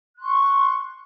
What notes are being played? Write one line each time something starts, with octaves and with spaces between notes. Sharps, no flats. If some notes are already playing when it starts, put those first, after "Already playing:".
C6 C#6 F#6